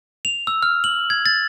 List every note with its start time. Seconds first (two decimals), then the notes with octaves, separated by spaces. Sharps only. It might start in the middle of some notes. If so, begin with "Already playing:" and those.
0.25 F7
0.47 E6
0.63 F6
0.84 F#7
1.10 G#6
1.26 A6